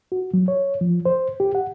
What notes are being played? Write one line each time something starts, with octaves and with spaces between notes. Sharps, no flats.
F#4
F#3
C#5
F3
C5
G4
F#5